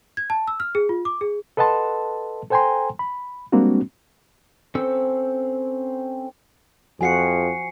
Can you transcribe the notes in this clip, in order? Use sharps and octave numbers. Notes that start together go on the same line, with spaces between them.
G#6
A5
E6
F6
G#4
F4
D6
G#4
A4 B4 D#5 F#5 A5 C6
A4 C5 G5 G#5 A#5 C6
B5
G3 G#3 A#3 C4 D4 F#4
C4 C#4 A4 C5 E6
F2 F3 F#4 F#5 G#5 C7 C#7